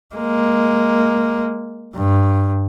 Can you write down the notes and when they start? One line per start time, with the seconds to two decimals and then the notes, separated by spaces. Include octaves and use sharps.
0.15 G#3 A#3
1.95 G2